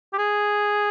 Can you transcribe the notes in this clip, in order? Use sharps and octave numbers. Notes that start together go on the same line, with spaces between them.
G4
G#4